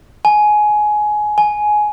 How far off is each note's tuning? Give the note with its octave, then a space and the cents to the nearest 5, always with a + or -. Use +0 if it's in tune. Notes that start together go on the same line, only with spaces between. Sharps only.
G#5 +20
G#5 +15